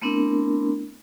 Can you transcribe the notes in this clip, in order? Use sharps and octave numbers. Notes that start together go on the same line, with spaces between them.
A3 B3 C4 D4 E4 A#4